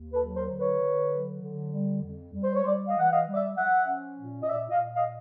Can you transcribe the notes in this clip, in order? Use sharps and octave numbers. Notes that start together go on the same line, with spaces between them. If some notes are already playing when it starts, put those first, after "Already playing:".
Already playing: D#2
A4 B4
F#3
A#4 C5
D3
B4 C#5
D3
F#3
D3
G3
F2
G3
C5
C#5
G3 C5 D5
D#5 F5
E3 F#5
D#5 F5
G3
D5 E5
F3 E5 F#5
C#4
A#2
D#5
A#2 D5 E5
D#5 F5
A#2
D#5 F5